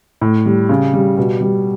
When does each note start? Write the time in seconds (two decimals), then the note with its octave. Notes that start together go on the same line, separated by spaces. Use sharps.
0.21 A2
0.46 G3
0.69 C#3
0.94 G3
1.18 B2
1.41 G3